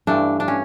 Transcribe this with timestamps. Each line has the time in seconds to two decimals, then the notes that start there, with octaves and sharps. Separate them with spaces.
0.07 G2 E3 A3 D4
0.40 D4
0.48 C#4